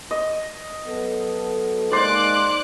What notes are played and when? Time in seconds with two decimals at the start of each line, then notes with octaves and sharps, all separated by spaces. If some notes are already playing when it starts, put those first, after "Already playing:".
0.11 D#5
0.86 F#3 B3 A4
1.92 G#3 A#3 D#4 C5 D5 D6 F#6